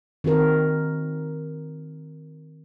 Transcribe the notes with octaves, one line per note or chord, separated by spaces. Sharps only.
D#3 C4 F#4 A#4